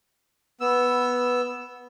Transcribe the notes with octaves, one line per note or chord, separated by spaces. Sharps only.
B3 E6